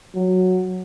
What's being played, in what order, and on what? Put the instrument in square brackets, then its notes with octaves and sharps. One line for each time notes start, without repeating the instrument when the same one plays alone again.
[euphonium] F#3